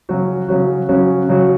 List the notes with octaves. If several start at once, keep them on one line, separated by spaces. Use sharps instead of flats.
C#3 F#3 C#4 F#4
C#3 F#3 C#4 F#4
C#3 F#3 C#4 F#4
C#3 F#3 C#4 F#4